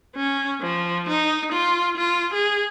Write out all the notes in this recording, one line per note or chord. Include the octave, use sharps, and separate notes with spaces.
C#4
F3
D#4
F4
F4
G#4